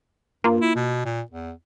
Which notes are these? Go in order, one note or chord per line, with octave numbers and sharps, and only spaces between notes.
G2 A#3 F4
E4
B2
A#2
E2